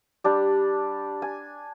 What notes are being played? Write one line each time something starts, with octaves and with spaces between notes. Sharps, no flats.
G3 D4 G4
G#5